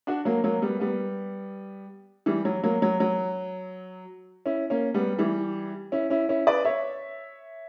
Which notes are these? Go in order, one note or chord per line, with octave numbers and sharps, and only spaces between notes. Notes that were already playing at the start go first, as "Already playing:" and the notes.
D4 F#4
F#3 A#3
F#3 A#3
G3 B3
G3 B3
E3 G3
F#3
F#3 A#3
F#3
F#3
C#4 E4
A#3 C#4
G3 B3
E3 G3
C#4 E4
C#4 E4
C#4 E4
B4 D5
C#5 E5